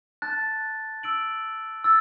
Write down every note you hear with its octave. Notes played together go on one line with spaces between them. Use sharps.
A5 F#6 A6
E6 D7 F#7
E6 A6